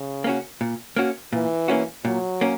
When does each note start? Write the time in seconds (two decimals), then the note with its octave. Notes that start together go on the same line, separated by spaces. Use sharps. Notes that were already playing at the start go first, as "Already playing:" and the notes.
Already playing: C#3
0.24 A#3 C#4 F#4
0.61 A#2
0.96 A#3 C#4 F#4
1.33 A#2 E3
1.68 A#3 C#4 F#4
2.05 A#2 F#3
2.41 A#3 C#4